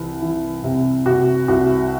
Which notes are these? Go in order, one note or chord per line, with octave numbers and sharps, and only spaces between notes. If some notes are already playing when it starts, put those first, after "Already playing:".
Already playing: C2 E3
E3
C3
C3 F#4
C2 F#4